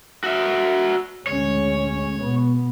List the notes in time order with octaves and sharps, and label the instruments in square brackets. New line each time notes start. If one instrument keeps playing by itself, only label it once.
[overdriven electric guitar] F#4 E5
[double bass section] D2 G#3 C#4 [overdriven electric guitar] C#5
[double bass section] B2 B3